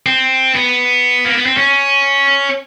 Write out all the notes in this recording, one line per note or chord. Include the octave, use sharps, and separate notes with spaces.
C4
B3
A#3
B3
C4
C#4